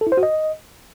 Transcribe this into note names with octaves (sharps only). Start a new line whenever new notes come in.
A4
E4
C5
F#4
D#5